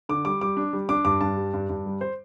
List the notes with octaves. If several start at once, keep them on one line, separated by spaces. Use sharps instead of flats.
D3 D6
G3 D6
G3 D6
D4
G3
D4 D6
G2 D6
G2 A5
G3
G2
G2
G3
C5